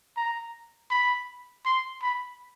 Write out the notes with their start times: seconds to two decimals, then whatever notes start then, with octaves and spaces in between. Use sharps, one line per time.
0.17 A#5
0.90 B5
1.65 C6
2.02 B5